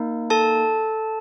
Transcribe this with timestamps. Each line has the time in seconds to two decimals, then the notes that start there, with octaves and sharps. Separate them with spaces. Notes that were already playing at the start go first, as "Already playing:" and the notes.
Already playing: A#3 D#4
0.30 A4 A5